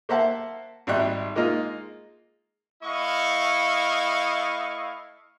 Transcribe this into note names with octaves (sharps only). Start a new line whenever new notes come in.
A#3 C5 E5 F#5 A5
G#1 G3 D#4 E5 G5 F#6
G#3 A#3 D#4 F4
A3 E4 D#5 F5 C#6